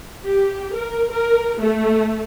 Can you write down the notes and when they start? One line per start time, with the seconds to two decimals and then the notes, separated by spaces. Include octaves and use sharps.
0.23 G4
0.75 A#4
1.13 A#4
1.61 A3